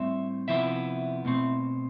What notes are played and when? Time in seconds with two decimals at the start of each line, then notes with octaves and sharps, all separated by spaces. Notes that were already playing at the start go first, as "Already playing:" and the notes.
Already playing: A2 G3 C4 E5
0.48 C3 F3 B3 E4 E5
1.25 B2 A3 C4